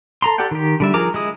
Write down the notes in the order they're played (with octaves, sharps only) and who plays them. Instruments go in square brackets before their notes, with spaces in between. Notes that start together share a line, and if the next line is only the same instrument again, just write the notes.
[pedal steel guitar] A4 A#5 C6
G4 A4 D5 F#5 G5
D#3 G4
D3 G3 E5
F3 G#4 A#4 A#5 D6
G#3 E4 D#6